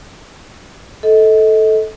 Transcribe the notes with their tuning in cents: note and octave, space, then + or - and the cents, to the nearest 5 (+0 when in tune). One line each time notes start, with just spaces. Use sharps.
A4 -5 D#5 +30